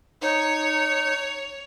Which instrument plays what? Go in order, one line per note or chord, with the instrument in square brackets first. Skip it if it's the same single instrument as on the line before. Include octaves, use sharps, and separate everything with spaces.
[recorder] D#4 [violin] C#5